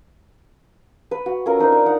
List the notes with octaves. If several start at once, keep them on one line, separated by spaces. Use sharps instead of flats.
B4
F#4
C#4 F4 A4 A#4
D4 D#4 A#4 C5
D5
D#4 F#5 A#5